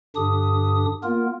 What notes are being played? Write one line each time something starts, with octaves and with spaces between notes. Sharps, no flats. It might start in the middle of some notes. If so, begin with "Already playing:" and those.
G2 D3 D4 G4 D#6
A#3 B3 F4 A#4